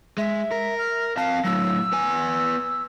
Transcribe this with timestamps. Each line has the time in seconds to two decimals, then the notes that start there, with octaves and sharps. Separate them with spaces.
0.18 G#3 E5
0.51 A#4
0.78 F6
1.17 C4 F5 A5
1.44 A2 F#3 E6
1.93 B3 G#5